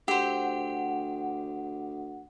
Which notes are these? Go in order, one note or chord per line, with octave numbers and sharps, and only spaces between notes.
D2 G4 C5 F#5